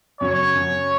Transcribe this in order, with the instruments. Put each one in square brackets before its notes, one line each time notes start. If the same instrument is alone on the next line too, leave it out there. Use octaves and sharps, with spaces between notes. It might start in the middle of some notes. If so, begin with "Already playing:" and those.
[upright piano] F#2 C#3 F#3 [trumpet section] C#5
[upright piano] F#2 C#3 F#3